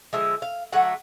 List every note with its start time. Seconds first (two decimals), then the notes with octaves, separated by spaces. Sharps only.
0.13 D3 F3 G#3 E5
0.42 F5
0.73 D3 F#3 A3 F#5